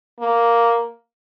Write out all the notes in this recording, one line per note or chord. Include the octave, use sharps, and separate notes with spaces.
A#3